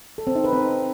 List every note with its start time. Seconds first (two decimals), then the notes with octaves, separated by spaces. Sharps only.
0.18 A4
0.27 C4
0.36 D#4
0.44 B4
0.53 C4